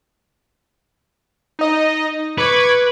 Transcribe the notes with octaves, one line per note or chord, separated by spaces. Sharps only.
D#4 D#5
B4 C#6 D6 G#6